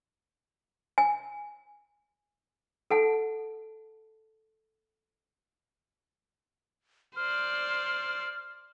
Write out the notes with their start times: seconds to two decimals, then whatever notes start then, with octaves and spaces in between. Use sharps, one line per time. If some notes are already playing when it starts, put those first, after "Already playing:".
0.98 G#5
2.90 A4 F#5 A5
7.16 C5 D5 F6